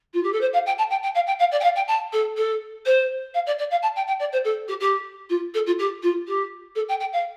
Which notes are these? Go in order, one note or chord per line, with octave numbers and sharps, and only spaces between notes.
F4
G4
A4
C5
F5
G5
A5
G5
G5
F5
G5
F5
D5
G5
F5
G5
A5
A4
A4
C5
F5
D5
D5
F5
A5
G5
G5
D5
C5
A4
G4
G4
F4
A4
F4
G4
F4
G4
A4
G5
G5
F5